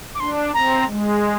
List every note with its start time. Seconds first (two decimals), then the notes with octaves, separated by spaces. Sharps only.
0.15 D6
0.20 D4 C6
0.54 C4 A#5
0.88 G#3